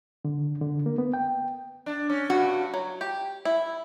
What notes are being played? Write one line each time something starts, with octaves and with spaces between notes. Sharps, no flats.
D3
D3
A#3
B3
G5
D4
C#4
G2 F#4
F#3
G4
E4